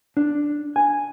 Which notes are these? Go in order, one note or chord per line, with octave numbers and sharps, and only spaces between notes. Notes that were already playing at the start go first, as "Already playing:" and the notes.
D4
G#5